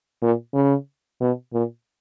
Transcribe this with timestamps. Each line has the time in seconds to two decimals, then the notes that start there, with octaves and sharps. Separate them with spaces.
0.22 A#2
0.54 C#3
1.21 B2
1.53 A#2